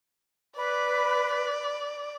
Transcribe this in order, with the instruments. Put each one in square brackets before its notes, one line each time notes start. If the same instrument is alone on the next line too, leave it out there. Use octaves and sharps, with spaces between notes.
[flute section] B4 [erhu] D5